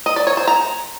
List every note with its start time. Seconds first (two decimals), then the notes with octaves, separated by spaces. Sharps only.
0.06 D#5
0.16 D5
0.27 C#5
0.37 C5
0.47 A#5